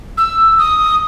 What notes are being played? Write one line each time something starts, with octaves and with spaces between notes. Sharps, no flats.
E6
D#6